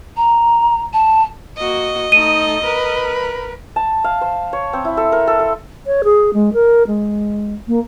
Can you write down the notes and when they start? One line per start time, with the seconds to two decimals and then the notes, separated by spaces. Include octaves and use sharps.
0.17 A#5
0.93 A5
1.57 A#3 F#4 D#5
2.12 A3 D#4 D#7
2.64 A#4 B4
3.76 A5
4.04 F5
4.21 C5
4.53 C#5
4.73 C4
4.85 E4
4.97 A4
5.12 A#4
5.27 A4
5.39 A4
5.86 C#5
6.04 G#4
6.34 G#3
6.54 A#4
6.88 G#3
7.68 A#3